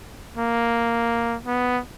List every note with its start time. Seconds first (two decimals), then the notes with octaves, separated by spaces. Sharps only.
0.37 A#3
1.46 B3